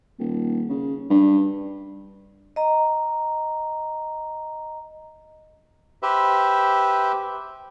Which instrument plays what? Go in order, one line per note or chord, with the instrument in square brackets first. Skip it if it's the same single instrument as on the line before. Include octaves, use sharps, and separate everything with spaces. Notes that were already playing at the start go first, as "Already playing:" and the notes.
[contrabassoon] D#1
C#3
G2
[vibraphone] D#5 A#5
[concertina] G4 B4 C5 E5